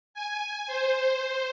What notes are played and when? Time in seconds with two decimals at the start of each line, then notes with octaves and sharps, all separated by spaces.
0.14 G#5
0.67 C5